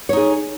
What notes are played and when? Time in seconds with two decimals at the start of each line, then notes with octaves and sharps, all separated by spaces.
0.09 C#5
0.13 D#4
0.17 G#4